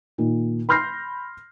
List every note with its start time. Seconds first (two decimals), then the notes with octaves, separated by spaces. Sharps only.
0.18 A#2 D#3
0.69 B5 C6 F6 G6 A#6 C7